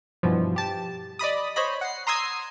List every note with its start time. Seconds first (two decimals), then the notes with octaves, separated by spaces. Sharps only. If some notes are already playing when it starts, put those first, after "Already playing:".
0.23 G2 B2 E3 F3
0.56 G4 A5
1.19 D5 D#5 B5 D#6
1.56 C5 C#5 D#5 B5
1.81 F#5 C7
2.07 A#5 C6 D#6 E6 G#6 C7